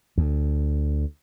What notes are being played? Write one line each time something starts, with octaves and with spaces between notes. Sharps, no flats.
D2